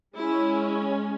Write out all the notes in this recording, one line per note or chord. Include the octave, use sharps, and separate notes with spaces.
G#3 C#4 E4